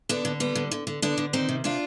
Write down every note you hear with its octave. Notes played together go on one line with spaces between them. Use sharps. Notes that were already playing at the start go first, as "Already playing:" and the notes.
D3 B3 D4
D3
G3 B3
D3
D3
D3
D3 B3 D4
D3
D#3 C4 D#4
C3
C3 D4 F4